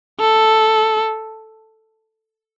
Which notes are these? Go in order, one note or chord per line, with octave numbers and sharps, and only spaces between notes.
A4